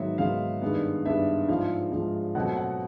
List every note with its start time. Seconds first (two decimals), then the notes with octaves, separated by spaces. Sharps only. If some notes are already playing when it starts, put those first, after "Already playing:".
Already playing: G#2 D#3 F#3 B3 E5
0.18 G#2 D#3 F#3 B3 F5
0.62 G2 D#3 G#3 B3
1.05 G2 D#3 G#3 B3 E5
1.48 G#2 F3 G#3 F5
1.92 G#2 F3 G#3
2.35 B2 F#3 A3 C4 F#5
2.56 F#5